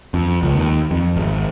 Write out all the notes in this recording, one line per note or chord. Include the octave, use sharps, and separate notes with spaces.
F2
C#2
D#2
F2
G#1